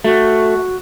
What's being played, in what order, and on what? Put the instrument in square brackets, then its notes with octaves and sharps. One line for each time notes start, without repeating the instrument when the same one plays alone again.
[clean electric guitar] A3 [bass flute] F#4